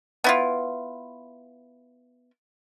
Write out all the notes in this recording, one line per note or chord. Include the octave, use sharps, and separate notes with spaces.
B3 E4 F4